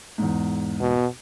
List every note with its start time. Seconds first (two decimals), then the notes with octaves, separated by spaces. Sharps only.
0.18 E2 G#2
0.81 B2